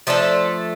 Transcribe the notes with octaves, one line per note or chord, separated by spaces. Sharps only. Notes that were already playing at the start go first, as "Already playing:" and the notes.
F3 A3 D4 A4